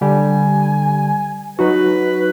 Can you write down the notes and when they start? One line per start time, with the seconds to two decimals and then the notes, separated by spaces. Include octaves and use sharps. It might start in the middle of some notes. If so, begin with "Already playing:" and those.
0.01 D3 G3 G#5
1.59 F#3 D#4 F#4 B4